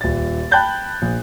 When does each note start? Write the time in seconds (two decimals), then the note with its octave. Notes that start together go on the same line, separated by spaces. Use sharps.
0.01 D#1 A6
0.51 G5 A5 B5 F#6 G6 A6
1.02 A#1